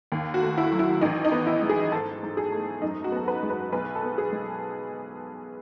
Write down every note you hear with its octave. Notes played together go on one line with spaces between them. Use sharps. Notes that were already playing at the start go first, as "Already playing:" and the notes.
D#2
F#4
A3
E4
F#3
E4
A1 D#4
D#4
B3
E4
G#3
G#4
G#2 A4
G#2
G#4
A3
F#2 D#4
F#4
B3 A4
B4
G#3
B4
B1 B4
A4
B3
G#4
G#3